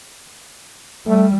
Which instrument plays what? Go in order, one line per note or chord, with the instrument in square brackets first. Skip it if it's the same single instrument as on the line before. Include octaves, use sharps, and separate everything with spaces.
[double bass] G3 [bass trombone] A3